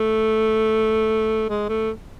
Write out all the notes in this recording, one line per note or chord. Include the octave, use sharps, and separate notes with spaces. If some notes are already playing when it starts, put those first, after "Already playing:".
Already playing: A3
G#3
A3